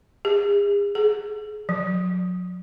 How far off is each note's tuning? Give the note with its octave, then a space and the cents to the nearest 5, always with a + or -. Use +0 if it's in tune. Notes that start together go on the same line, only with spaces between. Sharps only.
G#4 -40
G#4 +30
F#3 -40